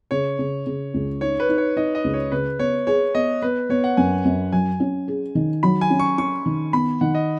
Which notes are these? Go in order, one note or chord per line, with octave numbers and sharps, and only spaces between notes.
C#3 C#5
C#3
C#3
C#2
D#4 C#5
B4
D#4
C#5
D#4 D#5
D#5
C#2
C#5
C#3 B4
B3 C#5
G#4 C#5
B3 D#5
B3 B4
B3 C#5
F#5
F#2 G#5
F#2
F#3 G#5
C#4
G#4
D#3
F#3 B5
G#5
C#4
C#6
C#4 C#6
D#3
B3 B5
D#3 F#5
D#5